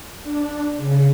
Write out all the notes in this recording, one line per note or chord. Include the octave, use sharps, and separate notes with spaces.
D4
C#3